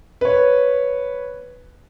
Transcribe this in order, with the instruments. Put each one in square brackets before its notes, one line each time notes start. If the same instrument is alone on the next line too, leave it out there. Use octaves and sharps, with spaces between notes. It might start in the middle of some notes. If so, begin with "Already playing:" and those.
[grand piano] B4 C#5